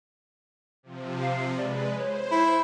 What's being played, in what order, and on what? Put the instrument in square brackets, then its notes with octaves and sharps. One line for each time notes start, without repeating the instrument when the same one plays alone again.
[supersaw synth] C3 F3
[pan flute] F5
[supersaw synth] G#3 B4 [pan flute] D5
[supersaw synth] C5 [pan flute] C#5
[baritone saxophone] E4